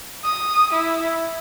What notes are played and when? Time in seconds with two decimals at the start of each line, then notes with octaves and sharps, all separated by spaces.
0.25 D#6
0.73 E4